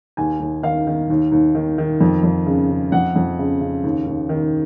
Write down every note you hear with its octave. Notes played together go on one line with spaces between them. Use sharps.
D#2 G#5
D#2
D#3 F5
D#3
D#2
D#2
D#3
D#3
F2
F2
C#3
C#3
F2 F#5
F2
C#3
C#3
D#2
D#2
D#3